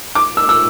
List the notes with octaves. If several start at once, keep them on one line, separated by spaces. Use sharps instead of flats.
D6
E6
E6